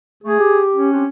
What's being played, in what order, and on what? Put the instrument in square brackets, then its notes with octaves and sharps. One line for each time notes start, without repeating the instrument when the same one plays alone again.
[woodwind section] A3 [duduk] G#4
[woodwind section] G4
[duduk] C#4
[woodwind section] C4 D4 G4